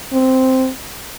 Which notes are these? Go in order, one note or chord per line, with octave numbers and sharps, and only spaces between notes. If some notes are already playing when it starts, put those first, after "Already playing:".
C4